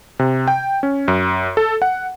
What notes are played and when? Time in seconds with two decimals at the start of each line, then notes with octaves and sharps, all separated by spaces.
0.19 C3
0.48 G5
0.83 C#4
1.08 F#2
1.57 A4
1.82 F#5